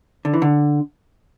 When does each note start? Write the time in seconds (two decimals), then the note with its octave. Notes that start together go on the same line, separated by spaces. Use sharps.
0.25 D3
0.34 E3
0.42 D3